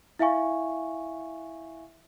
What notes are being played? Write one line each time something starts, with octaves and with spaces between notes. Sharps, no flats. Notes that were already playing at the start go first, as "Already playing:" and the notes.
E4 E5 F5 G#5 C#6